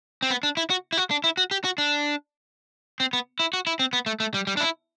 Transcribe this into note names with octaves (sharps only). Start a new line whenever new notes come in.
C4
B3
D4
E4
F#4
E4
F#4
D4
E4
F#4
G4
F#4
D4
C4
B3
E4
F#4
E4
C4
B3
A3
A3
G3
G3
D4
E4